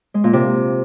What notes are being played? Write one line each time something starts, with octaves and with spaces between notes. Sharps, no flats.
G#3
A#2
C3